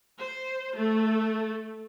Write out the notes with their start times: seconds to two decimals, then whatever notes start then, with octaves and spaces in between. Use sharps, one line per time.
0.21 C5
0.77 A3